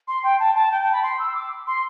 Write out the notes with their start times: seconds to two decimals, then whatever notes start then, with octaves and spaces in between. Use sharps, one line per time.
0.08 C6
0.24 G5
0.39 A5
0.55 A5
0.71 G5
0.81 G5
0.92 B5
1.03 C6
1.19 E6
1.35 D6
1.67 C6